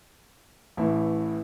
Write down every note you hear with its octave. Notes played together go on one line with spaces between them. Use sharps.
A1 A2 E3 E4